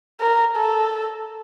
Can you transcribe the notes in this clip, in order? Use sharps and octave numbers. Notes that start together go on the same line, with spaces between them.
A#4
A4